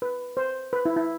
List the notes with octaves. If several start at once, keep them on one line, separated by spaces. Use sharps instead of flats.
B4
C5
B4
E4
E4